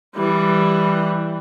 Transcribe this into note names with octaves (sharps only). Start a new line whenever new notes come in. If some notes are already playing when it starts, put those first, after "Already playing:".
E3 G3